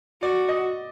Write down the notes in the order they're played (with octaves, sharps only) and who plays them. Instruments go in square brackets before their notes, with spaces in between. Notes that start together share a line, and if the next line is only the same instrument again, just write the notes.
[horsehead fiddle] F#4 [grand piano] D5
[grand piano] D#5